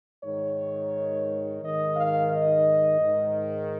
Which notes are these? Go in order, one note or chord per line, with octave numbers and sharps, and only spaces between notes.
G#2 D#3 C#5
G#2 D#3 D#5
F5
D#5
G#2 D#3